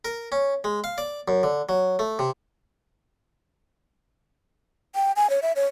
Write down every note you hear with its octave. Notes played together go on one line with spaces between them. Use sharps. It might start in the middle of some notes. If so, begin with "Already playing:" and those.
A#4
C#4
G#3
F5
D5
F#2
D3
F#3
A3
C3
G5
G#5
C#5
E5
C#5